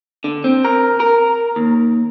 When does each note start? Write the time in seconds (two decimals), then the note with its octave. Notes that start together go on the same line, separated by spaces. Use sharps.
0.24 D3
0.44 C4
0.64 A#4
1.00 A#4
1.56 D#2